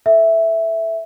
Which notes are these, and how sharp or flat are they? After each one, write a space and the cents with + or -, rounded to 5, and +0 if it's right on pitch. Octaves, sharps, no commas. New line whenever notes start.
A4 +0 E5 +0